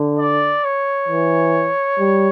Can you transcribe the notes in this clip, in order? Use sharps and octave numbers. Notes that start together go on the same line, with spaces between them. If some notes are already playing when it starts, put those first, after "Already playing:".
Already playing: D3
D5
C#5
E3
G3